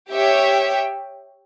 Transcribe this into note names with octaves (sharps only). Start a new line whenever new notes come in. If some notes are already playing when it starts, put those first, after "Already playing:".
G4 C#5 E5 G5